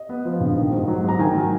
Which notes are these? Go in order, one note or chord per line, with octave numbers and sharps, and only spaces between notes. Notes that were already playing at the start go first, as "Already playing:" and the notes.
Already playing: D#5
B3
F3
A#1
D#3
G#2
F#3
G#2 A#5
D#3 G#5
F#3